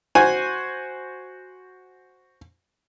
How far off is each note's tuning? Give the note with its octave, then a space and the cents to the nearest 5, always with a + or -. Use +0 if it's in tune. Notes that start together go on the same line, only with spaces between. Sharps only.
F#4 +0 C5 +0 G#5 +0